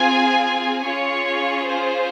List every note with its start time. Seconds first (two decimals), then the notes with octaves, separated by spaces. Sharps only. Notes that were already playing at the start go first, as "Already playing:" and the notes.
Already playing: C4 F4 G#4 G#5
0.85 C#4 F4 G#4 C#5
1.67 C5